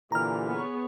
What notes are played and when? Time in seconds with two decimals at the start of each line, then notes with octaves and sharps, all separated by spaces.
0.12 A#2 D3 E3 G4 A#5 F6
0.48 B3 G#4 C#5